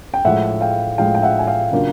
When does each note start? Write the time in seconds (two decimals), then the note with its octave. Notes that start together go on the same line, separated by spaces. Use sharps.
0.14 G5
0.25 A2 F3 G#3 E5 F#5
0.61 F5 G5
0.98 A2 F3 G#3 F5 G5
1.15 G5
1.22 E5 F#5
1.39 G#5
1.47 F5 G5
1.72 C#3 F#3 A#3 D4 F4